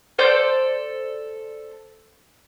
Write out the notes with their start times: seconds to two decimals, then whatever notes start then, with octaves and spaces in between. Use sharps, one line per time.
0.18 A4 C5 D5 G6